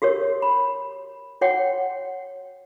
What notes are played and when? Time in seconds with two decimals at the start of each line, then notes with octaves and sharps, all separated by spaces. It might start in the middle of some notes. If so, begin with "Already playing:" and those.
0.02 F#4 G4 A#4 C#5
0.42 B5
1.41 F#4 C#5 F#5 G5